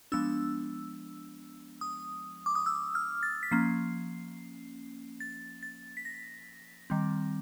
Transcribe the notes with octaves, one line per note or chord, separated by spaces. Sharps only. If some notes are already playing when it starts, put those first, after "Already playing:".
F3 G#3 B3 D4 E6
D#6
D6
D#6
E6
F6
A6
B6
F3 A#3 C#4 C7
A6
A6
B6
A#6
D#3 G3 C4